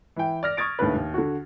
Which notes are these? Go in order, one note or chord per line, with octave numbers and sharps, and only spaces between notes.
E3 G5
D5 F6 A#6
C#6 D#6 G#6 A6 D7
D#2 A2 D4 B4
D#2
D3 F#4